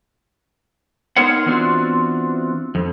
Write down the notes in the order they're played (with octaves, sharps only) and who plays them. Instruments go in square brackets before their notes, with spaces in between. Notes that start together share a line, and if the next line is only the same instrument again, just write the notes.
[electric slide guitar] B3 D#4 A#4 C5 C#5 F#5
E3 B3 C4 D4 F4 F#4
F2